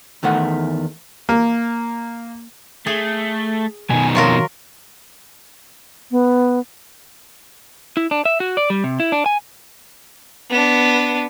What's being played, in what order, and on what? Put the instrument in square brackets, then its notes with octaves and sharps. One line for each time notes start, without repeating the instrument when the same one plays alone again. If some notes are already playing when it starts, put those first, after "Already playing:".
[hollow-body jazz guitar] E2 D#3 A3 F#5
[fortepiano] A#3
[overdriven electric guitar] A3 [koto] G#4
[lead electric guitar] B2 D#3 [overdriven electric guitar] G#5
[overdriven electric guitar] F2 [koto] F#3 F4 A#4
[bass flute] B3
[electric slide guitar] E4
D4
E5
F#4
D5
G3
C3
E4
D4
G#5
[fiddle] B3 D4